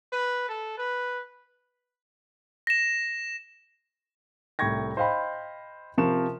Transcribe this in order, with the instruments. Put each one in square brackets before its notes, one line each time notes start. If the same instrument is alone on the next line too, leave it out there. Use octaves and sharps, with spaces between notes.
[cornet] B4
A4
B4
[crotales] A#6 E7
[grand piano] C2 A2 G5 C#6 G#6 A#6
C5 D#5 F5 G5 B5
C3 F3 A#4 C#6 E7